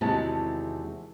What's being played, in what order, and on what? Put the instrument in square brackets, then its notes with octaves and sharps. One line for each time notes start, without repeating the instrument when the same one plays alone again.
[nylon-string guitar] E2 C3 D#3 G#3 F#4 A5